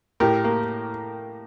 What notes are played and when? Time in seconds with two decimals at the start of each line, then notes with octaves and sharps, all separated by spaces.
0.20 A2 G4 A#4
0.44 A#3